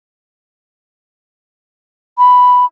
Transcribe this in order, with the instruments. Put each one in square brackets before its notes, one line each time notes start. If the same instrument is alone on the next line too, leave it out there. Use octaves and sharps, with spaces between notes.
[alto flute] B5